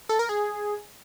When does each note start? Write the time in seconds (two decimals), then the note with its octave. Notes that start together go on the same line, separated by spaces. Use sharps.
0.09 A4
0.19 A#4
0.29 G#4